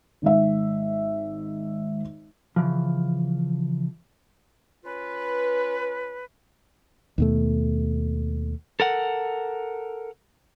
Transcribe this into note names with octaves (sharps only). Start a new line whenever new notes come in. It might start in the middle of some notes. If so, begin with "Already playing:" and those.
G#1 G#2 E5
C#3 E3 F3
C#4 F4 B4
D#2 B2 A3
A4 A#4 F#5